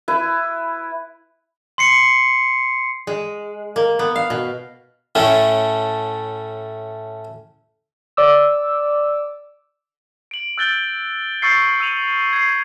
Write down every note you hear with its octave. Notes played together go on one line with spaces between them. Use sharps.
E4 B4
C6 C7 C#7
G#3
A#3
B3
F5
B2
A2 A3 C#4
D5 D6 E6
D7 F#7
E6 F#6 G6 A6 D7 G7
C#6 E6 G6 A6 C7 C#7
E6 D#7 F7 F#7
G#6 C7